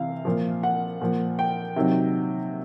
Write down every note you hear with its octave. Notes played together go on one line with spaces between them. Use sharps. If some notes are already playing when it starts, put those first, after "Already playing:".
Already playing: C3 E3 F5
A#2 F3
F#5
A#2 F3
G5
C3 D#3 F#3